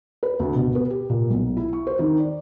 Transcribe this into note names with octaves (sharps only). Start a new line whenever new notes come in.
B4
D2
B2
B3
G4
A#2
B1
E4
C#6
C5
D#3
D5